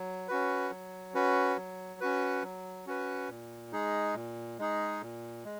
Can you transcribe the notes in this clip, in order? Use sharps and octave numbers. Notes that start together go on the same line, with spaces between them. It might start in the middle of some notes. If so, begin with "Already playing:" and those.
Already playing: F#3
C#4 F#4 B4
F#3
C#4 F#4 B4
F#3
C#4 F#4 B4
F#3
C#4 F#4 B4
A#2
G#3 D#4 G#4
A#2
G#3 D#4 G#4
A#2
G#3